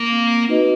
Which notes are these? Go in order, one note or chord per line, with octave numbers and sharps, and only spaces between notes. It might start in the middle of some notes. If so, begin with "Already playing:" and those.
Already playing: A#3
C4
D#4 F#4 B4 D#5